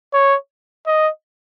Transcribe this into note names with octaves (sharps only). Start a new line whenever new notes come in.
C#5
D#5